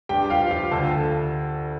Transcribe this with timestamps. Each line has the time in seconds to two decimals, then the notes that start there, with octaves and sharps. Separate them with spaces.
0.09 G2 G4 G5
0.30 F4 F5
0.40 F3
0.51 F4 F5
0.71 D2 A4 A5